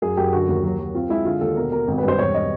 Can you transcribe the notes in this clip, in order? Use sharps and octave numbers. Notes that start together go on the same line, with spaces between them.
F#2 G#4
F#2 G4
D3 F#4
D#2
F#3
F#3
C4 F4
G#3 E4
D3 F4
D#2 A4
B2 A#4
B2 A#4
G#1
B4
G2 C5
E1 C#5
D#5